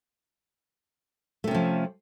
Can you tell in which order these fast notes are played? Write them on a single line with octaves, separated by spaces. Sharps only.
A3 C3 C#4 F3